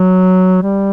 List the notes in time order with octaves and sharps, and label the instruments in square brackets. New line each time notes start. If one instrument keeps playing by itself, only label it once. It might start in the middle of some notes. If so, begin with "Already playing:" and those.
Already playing: [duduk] F#3
G3